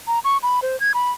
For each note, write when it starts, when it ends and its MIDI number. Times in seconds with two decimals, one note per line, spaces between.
0.07 0.19 82
0.24 0.37 85
0.43 0.60 83
0.62 0.79 72
0.80 0.92 92
0.94 1.11 83